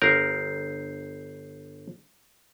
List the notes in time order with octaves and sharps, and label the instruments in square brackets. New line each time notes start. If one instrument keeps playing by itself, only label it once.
[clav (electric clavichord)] G1 A#4 [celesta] G6 C7